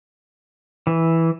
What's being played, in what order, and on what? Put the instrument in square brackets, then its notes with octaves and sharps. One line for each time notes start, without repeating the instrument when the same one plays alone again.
[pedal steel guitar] E3